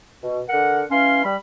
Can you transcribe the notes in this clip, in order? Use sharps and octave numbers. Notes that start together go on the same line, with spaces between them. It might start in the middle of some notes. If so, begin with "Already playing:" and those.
B2
D3 A#4 F#5
E3 C#4 F5 C6
G3 B5